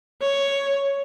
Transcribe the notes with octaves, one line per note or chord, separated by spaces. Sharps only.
C#5